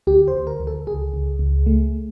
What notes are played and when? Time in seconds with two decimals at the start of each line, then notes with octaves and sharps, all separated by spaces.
0.07 D2 G4
0.28 C5
0.33 D2
0.47 A#4
0.60 D2
0.67 A4
0.87 C#2 G#4
1.13 C#2
1.39 C#2
1.66 A3